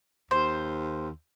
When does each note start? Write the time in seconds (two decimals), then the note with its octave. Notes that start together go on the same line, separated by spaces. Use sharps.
0.31 D#2 C5